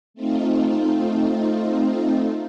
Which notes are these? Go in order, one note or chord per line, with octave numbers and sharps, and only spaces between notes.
A3 C4 D#4 F4